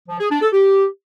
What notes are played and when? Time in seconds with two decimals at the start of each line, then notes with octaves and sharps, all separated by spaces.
0.09 F3
0.20 G#4
0.31 D4
0.42 A4
0.53 G4